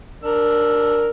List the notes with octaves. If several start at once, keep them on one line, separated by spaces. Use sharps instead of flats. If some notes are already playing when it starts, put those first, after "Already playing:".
D4 A#4 E6